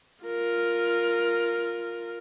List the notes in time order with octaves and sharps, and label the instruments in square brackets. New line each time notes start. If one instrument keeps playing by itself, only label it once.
[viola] F4 A#4